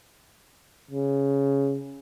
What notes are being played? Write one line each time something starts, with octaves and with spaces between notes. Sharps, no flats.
C#3